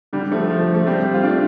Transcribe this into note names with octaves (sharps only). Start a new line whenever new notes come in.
D3 G3
F3 A3
F3
F3 A3
G3 C4
F4
A3 D4